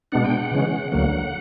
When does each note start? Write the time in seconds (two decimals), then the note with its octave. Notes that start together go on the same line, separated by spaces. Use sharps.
0.12 B2 G#3 B3 D4 F#5
0.25 G5
0.37 F#5
0.52 C#3 E3 G#3 C#4
0.92 D2 D3 F#3 A#3 F#5